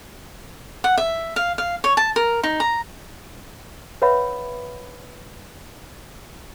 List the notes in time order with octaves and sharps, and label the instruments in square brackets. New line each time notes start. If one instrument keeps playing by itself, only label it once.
[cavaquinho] F#5
E5
F5
F5
C#5
A5
A#4
D#4
A#5
[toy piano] B4 C#5 E5 F#5 B5